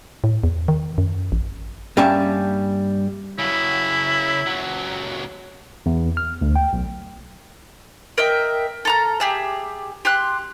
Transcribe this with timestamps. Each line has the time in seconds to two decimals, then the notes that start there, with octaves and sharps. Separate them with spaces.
0.24 A2
0.44 E2
0.68 D#3
0.98 F#2
1.32 A1
1.97 G2 G3 A#3 C#4 E5 A5
3.39 C#3 F#3 E4
4.47 C#2 F#3
5.86 E2
6.17 F6
6.41 D2
6.56 G5
6.73 B1
8.18 A#4 D#5 E5 G5
8.85 A4 A#5 F6
9.20 G4 G#4 E5
10.05 G4 C6 F#6